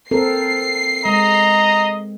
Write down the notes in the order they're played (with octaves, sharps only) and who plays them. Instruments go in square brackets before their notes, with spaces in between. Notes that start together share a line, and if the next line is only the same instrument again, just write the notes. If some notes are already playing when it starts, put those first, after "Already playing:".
[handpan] C4 A4 A#4 [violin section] C7
[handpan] G#3 [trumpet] D#5 [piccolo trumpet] A#5